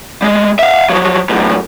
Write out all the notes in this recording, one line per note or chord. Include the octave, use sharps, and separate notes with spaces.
G3 G#3
E5 F5
F3 F#3
F#2 A2